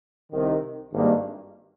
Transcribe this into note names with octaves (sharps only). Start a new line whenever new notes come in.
C2 C3 D#3
G#1 G2 D#3 G3 A#3